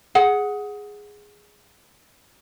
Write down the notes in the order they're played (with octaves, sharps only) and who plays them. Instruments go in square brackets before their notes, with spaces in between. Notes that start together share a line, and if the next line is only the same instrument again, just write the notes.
[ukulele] G#4 F#5